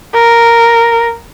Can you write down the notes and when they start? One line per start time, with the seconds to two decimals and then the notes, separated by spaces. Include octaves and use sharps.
0.14 A#4